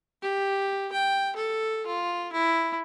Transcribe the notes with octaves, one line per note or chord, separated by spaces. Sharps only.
G4
G5
A4
F4
E4